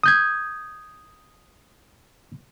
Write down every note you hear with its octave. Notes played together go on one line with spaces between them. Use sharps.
D#6 G6 G#6